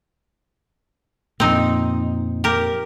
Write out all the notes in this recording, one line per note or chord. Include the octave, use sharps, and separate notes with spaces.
F2 A#2 C4 D#4
G4 A#4